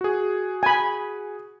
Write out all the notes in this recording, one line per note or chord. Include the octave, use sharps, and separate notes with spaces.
F#4 G#4
G#5 B5